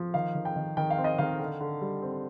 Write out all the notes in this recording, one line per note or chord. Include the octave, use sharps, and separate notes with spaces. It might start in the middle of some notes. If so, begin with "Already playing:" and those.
Already playing: F3
D#3 F5
D#3
G5
D#3
D#3 G5
F5
C4
D#5
D#3 F5
D3
D3
G3
C4